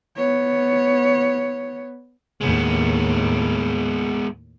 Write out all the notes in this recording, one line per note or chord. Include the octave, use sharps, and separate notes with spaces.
B3 C#5
D#2 A2 G#3 B3